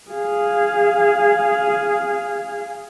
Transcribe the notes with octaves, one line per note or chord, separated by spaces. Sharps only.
G#4 F5